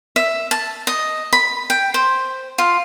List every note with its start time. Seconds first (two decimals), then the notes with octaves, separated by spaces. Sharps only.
0.16 E5
0.51 A5
0.87 D#5
1.33 B5
1.70 G5
1.94 C5
2.58 F4